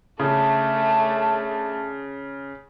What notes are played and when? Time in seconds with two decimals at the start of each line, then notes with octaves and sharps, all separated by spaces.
0.20 C#3 A3 D4